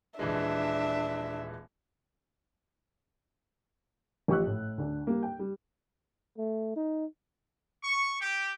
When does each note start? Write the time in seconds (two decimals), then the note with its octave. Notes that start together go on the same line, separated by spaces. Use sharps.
0.19 D#1 E3 G#3 D4 E5
4.28 A1 F3 G4 C#6 E6 F#6
4.47 A2
4.78 D2 D4
5.07 G3 A#3
5.23 G5
5.39 G3
6.37 A3
6.76 D#4
7.84 C#6
8.21 G4